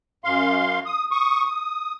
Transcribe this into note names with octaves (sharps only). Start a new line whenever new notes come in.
F#2 F5 C6
D#6
C#6 D#6
D#6